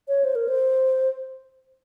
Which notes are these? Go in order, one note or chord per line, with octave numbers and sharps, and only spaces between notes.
C#5
C5
A#4
C5